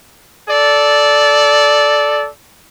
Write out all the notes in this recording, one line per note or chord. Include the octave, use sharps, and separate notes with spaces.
A4 D5